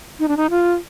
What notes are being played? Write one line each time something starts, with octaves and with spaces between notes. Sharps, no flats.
D#4
D4
D#4
F4